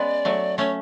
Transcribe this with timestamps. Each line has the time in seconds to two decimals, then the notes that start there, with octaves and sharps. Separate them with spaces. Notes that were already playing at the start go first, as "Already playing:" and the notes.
Already playing: G#3 B3 C#4 D5
0.25 F#3 A3
0.58 A3 C#4 C#5